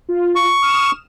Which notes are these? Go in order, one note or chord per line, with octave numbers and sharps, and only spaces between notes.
F4
C#6
D#6 F6 E7